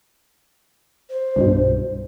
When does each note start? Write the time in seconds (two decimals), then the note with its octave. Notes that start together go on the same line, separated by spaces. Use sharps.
1.10 C5
1.36 C2 G2 B2